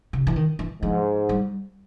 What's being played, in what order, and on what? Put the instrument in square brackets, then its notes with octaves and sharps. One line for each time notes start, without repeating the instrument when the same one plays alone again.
[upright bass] C#3
E3
D#3
E3
[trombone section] G#2 [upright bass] F3
[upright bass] G3